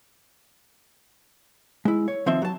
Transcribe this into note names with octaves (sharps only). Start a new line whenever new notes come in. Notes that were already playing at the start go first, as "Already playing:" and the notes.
G#3 E4
C#5
D#3 F3 C4 E5 C6
F#3 A5